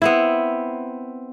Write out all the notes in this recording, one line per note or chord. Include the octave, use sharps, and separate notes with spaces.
B3 C4 E4